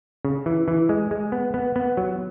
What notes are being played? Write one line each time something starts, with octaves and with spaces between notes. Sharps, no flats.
C#3
E3
E3
G#3
G#3
B3
B3
B3
F#3